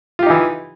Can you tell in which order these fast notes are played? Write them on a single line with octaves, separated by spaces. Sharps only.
F4 G4 D#4 E3